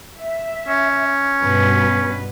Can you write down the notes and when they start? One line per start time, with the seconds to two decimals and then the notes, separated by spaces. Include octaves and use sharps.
0.18 E5
0.68 C#4
1.41 G2 B2 B4